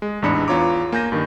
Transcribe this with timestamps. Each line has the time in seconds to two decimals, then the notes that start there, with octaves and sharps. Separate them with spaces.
0.02 G#3
0.22 A1 E2 G#2 D4 B5 C#7
0.48 E2 B3 F4 C#5 A#5 D6
0.92 A#3 G#5 G6 A#6 D#7
1.12 G2 D#3